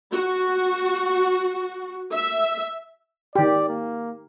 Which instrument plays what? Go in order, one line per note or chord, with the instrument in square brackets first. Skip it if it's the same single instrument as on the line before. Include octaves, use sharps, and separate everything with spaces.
[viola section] F#4
E5
[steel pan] D#3 G4 [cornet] D5
[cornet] A#3